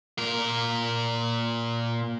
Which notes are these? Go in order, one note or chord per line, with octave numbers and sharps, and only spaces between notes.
A#2 A#4